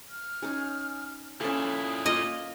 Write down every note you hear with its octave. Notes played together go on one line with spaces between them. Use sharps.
F6
C#4 D#4 G#4
A#2 C#4 E4 A4 D#6
A#3 F4 D#5